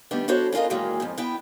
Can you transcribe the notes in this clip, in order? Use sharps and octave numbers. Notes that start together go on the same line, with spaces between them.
D#3 G3 A3 B3 D4
D4 E4 F#4 A4 C5 C#5
C#4 D4 F4 A#4 D#5
A#2 D#3 E3 F#3 G#3 A#3
F2 G#2
B3 E4 G5